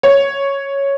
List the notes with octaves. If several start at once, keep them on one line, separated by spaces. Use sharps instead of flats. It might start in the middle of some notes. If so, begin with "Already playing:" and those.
C#5